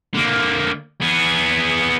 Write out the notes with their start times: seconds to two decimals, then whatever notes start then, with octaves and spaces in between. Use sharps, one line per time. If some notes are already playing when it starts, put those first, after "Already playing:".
0.14 D3 A#3
1.02 B3 G#4